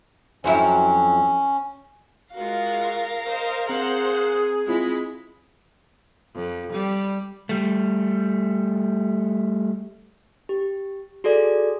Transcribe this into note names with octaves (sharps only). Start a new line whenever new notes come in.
F2 F#3 C#4 E4
G#3 F4 F#4 A#4 F5
C5 D#5
C4 G#4 C5 F#5 A#5
G#3 C4 E4 F4 B5
F2
G3
G3 A3
G4
F#4 G#4 A4 D5